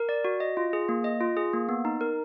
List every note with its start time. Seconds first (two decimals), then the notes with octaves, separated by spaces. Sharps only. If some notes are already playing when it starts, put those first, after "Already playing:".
Already playing: A#4
0.09 D5
0.24 F#4
0.40 D#5
0.57 F4
0.73 G#4
0.89 A#3
1.04 D#5
1.21 F4
1.37 G#4
1.53 A#3
1.69 B3
1.85 D#4
2.01 A#4